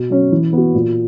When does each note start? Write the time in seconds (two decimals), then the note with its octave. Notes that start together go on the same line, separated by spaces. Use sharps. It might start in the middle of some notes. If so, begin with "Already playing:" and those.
Already playing: B2
0.10 F#3 C#4
0.32 E3
0.53 B3 F#4
0.75 A#2